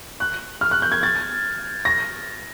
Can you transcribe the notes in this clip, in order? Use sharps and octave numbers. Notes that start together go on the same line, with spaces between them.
F#6
F6
F#6
G6
G#6
A6
A#6